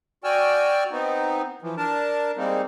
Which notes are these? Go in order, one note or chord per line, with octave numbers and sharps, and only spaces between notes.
F#4 D5 G5 G#5 E6 F6
B3 C4 D#4
E3 F3
D4 A#4 A5
G3 G#3 A#3 C4 D#4